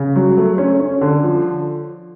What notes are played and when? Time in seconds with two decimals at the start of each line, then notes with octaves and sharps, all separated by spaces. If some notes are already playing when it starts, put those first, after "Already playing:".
Already playing: C#3
0.16 F#3
0.37 A3
0.58 C#4
0.79 C#4
1.01 D3
1.23 F3